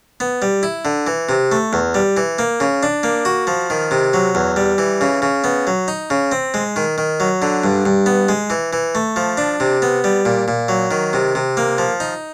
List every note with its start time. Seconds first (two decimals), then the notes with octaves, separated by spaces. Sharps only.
0.20 B3
0.42 G3
0.63 E4
0.85 D3
1.07 E3
1.29 C3
1.52 A3
1.73 E2
1.94 G3
2.17 E3
2.39 A#3
2.60 C#3
2.83 D4
3.03 A#3
3.25 F#4
3.47 F3
3.70 D#3
3.91 C3
4.13 F#3
4.35 E2
4.56 G3
4.78 E3
5.01 C#3
5.22 C#3
5.44 B3
5.67 F#3
5.88 D#4
6.10 C#3
6.32 C4
6.54 G#3
6.76 D#3
6.98 D#3
7.20 F#3
7.42 D3
7.64 G2
7.86 G2
8.06 B3
8.29 G#3
8.50 E3
8.73 E3
8.95 A3
9.16 F3
9.37 D4
9.60 C3
9.82 B3
10.04 G3
10.25 A#2
10.48 A#2
10.68 F#3
10.91 D#3
11.13 C3
11.35 C3
11.57 A#3
11.78 F3
12.00 D#4